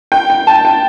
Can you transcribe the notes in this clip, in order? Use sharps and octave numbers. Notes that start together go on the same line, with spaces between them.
G5
G5
A5
G5